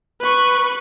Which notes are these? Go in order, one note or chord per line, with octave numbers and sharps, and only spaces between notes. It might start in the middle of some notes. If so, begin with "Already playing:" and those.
B4 C#6